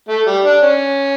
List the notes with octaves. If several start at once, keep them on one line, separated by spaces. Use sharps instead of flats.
A3
G3
D4
C#4